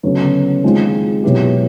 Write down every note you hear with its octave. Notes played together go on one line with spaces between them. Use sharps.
D2 C#3 F#3 B3
D#3 G#3 C4 F4 G#4
B2 F#3 B3 E4 G4